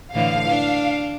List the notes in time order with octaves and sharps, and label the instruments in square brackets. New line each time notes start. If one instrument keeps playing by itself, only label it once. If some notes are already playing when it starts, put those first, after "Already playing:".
[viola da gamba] A2 D3 E3 [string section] F5
[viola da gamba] D4